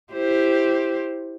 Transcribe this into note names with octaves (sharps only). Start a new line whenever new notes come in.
E4 G4 C5